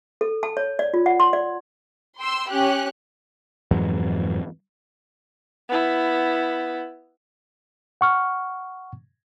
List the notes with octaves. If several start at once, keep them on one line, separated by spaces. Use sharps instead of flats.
A4
A5
C#5
D5
F4
F#5
C6
D5
G5 C6 E6
C#4 G4 F#6
F2 G#2 E3 F#3
B3 E4
F#5 C#6 F6